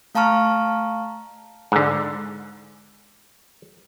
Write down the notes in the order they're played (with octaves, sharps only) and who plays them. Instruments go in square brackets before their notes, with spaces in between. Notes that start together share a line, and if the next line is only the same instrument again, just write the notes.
[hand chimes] A3 F5 A5 A#5 C#6 F6
[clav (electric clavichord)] G#2 D3